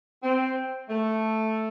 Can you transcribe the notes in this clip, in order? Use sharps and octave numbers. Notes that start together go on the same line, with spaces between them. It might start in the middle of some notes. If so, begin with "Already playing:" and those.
C4
A3